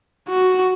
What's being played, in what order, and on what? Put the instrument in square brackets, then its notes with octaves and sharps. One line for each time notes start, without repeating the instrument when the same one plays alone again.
[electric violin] F#4